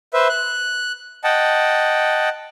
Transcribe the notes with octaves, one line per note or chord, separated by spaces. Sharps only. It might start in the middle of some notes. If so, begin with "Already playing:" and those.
B4 C5 E5
F#6
D#5 F#5 G5 A5